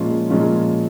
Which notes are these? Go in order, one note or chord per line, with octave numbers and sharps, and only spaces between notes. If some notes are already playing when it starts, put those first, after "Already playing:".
Already playing: A#2 F3 G#3 C#4 F4
A#2 F3 G#3 C#4 F4